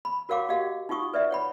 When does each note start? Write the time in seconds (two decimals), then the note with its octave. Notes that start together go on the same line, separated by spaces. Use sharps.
0.05 B5
0.29 F#4 A#4 C#5 F5 F#5 D6
0.49 F#4 G4 D#5 F5 F#5
0.89 D#4 F4 F#5 C#6 D#6
1.14 B4 D5 E5 F#5
1.31 C#5 F#5 B5